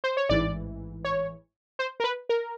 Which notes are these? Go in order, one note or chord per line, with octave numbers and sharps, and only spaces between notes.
C5
C#5
A1 G#2 E3 D5
C#5
C5
A#4
B4
A#4